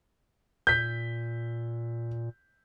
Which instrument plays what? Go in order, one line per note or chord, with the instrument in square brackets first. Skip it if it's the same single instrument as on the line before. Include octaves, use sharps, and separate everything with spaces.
[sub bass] A#2 [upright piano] G6 B6